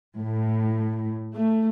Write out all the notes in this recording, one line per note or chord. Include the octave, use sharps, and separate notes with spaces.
A2
A3